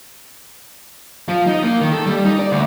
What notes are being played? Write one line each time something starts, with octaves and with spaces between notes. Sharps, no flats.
F3
D#4
A#3
D#3
A4
G3
D#4
D5
D2